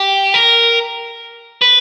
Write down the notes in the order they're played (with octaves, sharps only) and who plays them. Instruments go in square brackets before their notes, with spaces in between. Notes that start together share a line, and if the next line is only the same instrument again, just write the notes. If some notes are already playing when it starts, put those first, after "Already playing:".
Already playing: [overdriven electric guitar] G4
A#4
B4